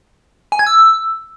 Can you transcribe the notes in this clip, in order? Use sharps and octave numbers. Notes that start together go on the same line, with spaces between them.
G#5
G#6
E6